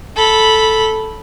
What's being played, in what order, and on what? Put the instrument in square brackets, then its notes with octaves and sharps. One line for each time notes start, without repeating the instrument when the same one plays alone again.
[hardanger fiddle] A4 B5